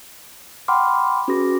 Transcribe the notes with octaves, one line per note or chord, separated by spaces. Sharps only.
F#5 G5 B5 C6 D6 F6
C#4 F#4 G#4 B4 D6 A#6